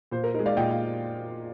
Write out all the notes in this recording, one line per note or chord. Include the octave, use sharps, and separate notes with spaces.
A#2 C5
A#4
G#3 D#4 A#4
D5 F5
A#2 D#5 G5
F5